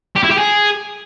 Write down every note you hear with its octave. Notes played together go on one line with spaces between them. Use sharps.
G4
E4
G4
G#4